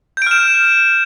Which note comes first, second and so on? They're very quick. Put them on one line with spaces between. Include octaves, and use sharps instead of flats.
G6 D7 F6 E7